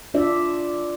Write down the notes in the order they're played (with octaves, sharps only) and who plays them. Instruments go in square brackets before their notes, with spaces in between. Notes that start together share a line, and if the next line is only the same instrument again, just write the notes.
[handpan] D4 F4 D5 E5